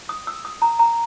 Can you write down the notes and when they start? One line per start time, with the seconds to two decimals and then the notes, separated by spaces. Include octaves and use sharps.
0.09 D#6
0.27 E6
0.45 D#6
0.62 A#5
0.79 A#5